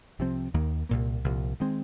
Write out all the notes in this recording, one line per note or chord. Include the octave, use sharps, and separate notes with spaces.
C2 C3 F3 C4
D#2 D#3 A#3
C2 A#2 A#3
C2 A#2 F3
D#3 G#3 C4